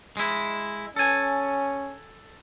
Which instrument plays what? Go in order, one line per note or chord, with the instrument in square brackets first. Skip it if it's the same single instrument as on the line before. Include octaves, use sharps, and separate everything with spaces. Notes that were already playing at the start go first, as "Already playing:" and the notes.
[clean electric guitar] G#3 E4
[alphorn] C#4 [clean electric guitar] A4 G#5